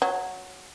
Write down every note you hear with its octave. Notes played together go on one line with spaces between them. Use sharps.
F#3